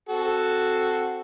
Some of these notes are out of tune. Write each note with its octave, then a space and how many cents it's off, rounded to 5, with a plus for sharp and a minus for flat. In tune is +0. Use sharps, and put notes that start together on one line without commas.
C4 +0 F#4 +0 A4 +0